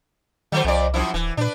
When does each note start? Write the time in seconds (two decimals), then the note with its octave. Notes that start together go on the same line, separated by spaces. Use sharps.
0.52 D#3 F#3 A3 C5
0.64 C2 F2 D5
0.94 F#2 F3 E4
1.14 D1 E3
1.37 A#2 D4 B4